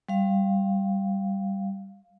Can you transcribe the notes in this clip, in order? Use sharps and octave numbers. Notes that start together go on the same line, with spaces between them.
G3 F5